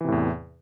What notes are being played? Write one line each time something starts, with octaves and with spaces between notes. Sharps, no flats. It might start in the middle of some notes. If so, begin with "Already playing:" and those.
E2 A2 C3 E3